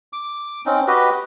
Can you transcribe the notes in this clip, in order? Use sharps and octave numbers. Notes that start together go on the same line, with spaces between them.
D6
C4 C#4 D#4
F#4 G4 B4 D#5